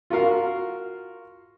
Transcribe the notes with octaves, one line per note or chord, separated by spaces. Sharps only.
F4 F#4 A#4 F5